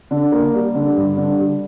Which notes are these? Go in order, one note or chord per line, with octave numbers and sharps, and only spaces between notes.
D3
A#3
G3
D3
G2
D3
G3